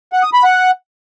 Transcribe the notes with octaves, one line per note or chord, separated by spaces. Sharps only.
F#5
D#6
B5
F#5